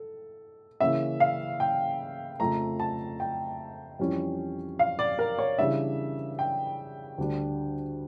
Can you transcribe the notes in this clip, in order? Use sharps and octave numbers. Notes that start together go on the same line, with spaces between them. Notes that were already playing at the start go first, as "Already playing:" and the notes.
Already playing: A4
C#3 E3 A#3 C#4 E5
F5
G5
F2 C#3 F3 A3 A#5
A5
G5
F2 E3 G3 C#4
F5
D5
A#4
C#5
C#3 E3 G3 D4 E5
G5
D2 D3 G3 D4